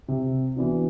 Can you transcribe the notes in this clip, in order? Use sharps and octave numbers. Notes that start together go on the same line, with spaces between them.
C3
E3 B3 D4 F#4